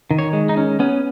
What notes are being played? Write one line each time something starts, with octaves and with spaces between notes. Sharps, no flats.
D#3
C#5
G#3
D#4
C#4
B3 C#4